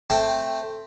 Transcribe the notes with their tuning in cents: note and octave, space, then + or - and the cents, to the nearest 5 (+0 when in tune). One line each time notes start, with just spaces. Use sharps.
A3 +0 C4 +10 G5 +0